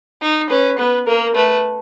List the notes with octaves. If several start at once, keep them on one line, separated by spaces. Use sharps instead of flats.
D#4
C#4 B4
B3 B4
A#3 A#4
A3 B4